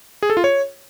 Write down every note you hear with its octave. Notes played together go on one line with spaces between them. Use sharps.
G#4
A4
F4
C#5